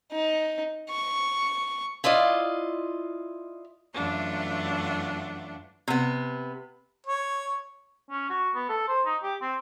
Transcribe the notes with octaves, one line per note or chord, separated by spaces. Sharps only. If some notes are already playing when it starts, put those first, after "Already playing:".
D#4
C#6
E4 F4 D5 D#5 F5
F#2 E3 A3 D4 F4 F#5
C3 B3
C#5
C#4
F#4
B3
A4
C5
D#4
G4
C4